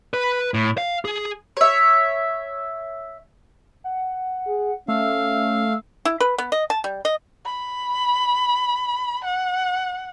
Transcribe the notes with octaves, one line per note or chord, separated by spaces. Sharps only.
B4
A2
F5
G#4
C#5 E5
F#5
G#4
A3 C#4 F5 E6
E4
B4
B3
D#5
A5
G3
D#5
B5
F#5